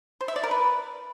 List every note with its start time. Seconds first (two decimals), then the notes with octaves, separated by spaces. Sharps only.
0.21 C5
0.28 E5
0.36 D5
0.43 A#4
0.51 B4